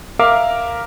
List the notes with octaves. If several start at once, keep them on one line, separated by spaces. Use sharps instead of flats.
A#4 E5 F5 D6